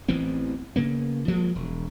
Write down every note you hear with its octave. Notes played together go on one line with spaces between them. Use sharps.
A1 E3 B3 C4
C#3 A#3 B3
F3 F#3 G#3 A#3
E1